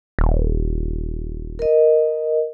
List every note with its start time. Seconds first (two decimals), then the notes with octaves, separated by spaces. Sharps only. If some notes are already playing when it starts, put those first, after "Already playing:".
0.19 D#1
1.59 A#4 D#5